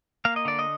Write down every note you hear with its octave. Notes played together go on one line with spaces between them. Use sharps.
A#3 F5
D#5
D3 D5
D#5